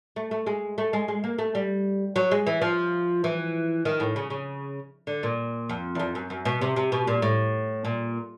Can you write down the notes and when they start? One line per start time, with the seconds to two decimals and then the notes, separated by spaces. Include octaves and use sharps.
0.16 A3
0.31 A3
0.47 G#3
0.78 A3
0.93 G#3
1.08 G#3
1.24 A#3
1.39 A3
1.55 G3
2.16 F#3
2.31 G#3
2.47 E3
2.62 F3
3.24 E3
3.85 D#3
4.00 A2
4.16 C#3
4.30 C#3
5.07 D3
5.23 A#2
5.69 F2
5.95 E2
6.00 F2
6.15 F#2
6.30 F#2
6.45 B2
6.61 C3
6.76 C3
6.92 B2
7.07 A#2
7.22 A2
7.85 A#2